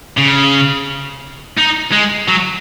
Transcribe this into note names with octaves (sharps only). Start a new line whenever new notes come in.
C#3
D#4
G#3
F#3